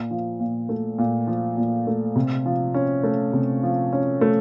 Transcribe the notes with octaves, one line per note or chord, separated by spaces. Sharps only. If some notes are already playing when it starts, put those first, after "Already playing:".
Already playing: A#2
F3
A#2
A3
A#2
F3
A#2
A3
C3
F3
C#4
A3
C3
F3
C#4
A3